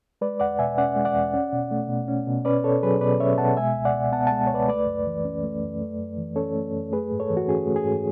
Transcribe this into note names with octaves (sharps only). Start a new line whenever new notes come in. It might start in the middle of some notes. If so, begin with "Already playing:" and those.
G#3 B4 D5
E2 D5 F#5
B2 E5 G#5
C#4 D5 F#5
G#3
D5 F#5
E2
C#4
B2
A3
B2
C#4
B2
C#4 B4 D5
B2 A4 C#5
F#3 G#4 B4
B2 B4 D5
C#4 C#5 E5
B2 F#5 A5
G#3 E5 G#5
C#2
D5 F#5
B2
B3 F#5 A5
G#3 F#5 A5
C#5
C#2 B4 D5
A3 B4 D5
F#2
E3
C#4
A3
F#2
A3
F#2
E3
C#4 A4 C#5
A3
F#2
A3 G#4 B4
G#2
A4 C#5
E3
F#4
C#4 G#4
A3
G#4
G#2